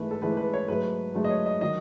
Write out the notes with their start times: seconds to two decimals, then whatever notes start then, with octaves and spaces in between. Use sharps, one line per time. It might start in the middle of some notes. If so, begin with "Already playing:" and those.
Already playing: G#2 E3 A3 B4
0.11 A4
0.22 G#2 E3 A3 B4
0.37 B4
0.54 C#5
0.68 G#2 F#3 A3 B4
1.14 G#2 F#3 A3
1.24 D#5
1.30 C#5
1.46 D#5
1.61 D#3 F#3 D#5